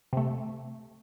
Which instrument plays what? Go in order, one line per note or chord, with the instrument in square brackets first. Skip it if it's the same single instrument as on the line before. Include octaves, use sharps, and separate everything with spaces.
[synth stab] C3 A3